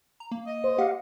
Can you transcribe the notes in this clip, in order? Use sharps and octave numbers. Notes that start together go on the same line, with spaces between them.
A#5
A#3
D#5
C5
G4 F5 F#5